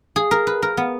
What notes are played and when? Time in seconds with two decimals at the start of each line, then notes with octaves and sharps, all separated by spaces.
0.16 G#4
0.31 A#4
0.47 B4
0.62 A#4
0.77 B3